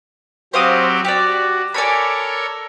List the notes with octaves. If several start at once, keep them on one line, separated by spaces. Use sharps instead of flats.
F#3 C4 G4 C5 F5 D#6
F#4 G4 D5
A4 A#4 C#5 D5 G#5 B5